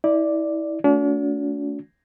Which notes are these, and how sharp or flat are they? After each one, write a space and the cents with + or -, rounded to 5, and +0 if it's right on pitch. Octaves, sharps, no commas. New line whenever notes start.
E4 -30 D5 +0
A3 +0 D4 -45 F#4 -35